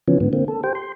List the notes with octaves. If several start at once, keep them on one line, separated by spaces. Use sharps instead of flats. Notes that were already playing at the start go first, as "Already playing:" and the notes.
C#3 E3 F3 B3 C#4
G#2 D3 B3
D3 A#3 C4
A4
G4 C5 G5
C6